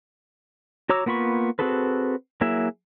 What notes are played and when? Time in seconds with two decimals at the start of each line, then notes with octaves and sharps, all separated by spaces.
0.89 F#4 C#5 A#5 D6 E6
1.06 A#3 B3 F4 B5 C#6
1.59 C4 F#4 G#4 A4 B4
2.41 F#3 A#3 E4 G#4 E5